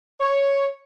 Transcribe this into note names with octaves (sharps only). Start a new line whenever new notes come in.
C#5